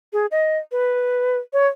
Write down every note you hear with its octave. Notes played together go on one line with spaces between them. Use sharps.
G#4
D#5
B4
C#5